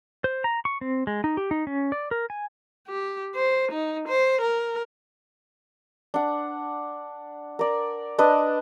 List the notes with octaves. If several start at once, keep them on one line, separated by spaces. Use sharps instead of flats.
C5
A#5
C#6
C4
G#3
D#4
G4
D#4
C#4
D5
A#4
G#5
G4
C5
D#4
C5
A#4
D4 F#5
A#4 D5
D4 B4 D5 D#5